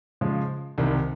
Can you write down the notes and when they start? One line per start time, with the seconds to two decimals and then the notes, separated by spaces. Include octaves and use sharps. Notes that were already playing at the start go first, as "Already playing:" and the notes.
0.21 C#3 F3 G#3
0.78 C2 C3 D#3